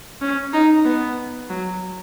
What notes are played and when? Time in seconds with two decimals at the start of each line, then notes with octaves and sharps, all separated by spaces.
0.21 C#4
0.53 D#4
0.85 B3
1.49 F#3